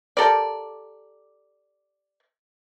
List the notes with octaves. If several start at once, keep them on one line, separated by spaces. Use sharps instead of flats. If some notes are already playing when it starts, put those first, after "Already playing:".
G4 A4 A#4 D5